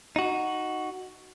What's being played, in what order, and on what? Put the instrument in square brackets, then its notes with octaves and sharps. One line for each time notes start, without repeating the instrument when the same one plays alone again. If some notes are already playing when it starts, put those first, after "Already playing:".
[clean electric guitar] D#4 F#4